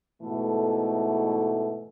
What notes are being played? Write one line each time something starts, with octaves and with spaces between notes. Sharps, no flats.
G#2 B2 E3 A3